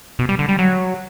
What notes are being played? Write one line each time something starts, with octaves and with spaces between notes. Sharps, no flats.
B2
G3
D3
G3
F#3